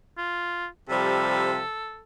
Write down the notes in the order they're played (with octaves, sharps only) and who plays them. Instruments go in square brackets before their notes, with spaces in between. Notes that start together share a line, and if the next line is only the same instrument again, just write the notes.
[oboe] F4
[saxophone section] C3 F3 G3 [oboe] A4